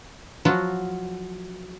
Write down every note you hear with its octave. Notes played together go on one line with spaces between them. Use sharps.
F3 F#3 F4 F#4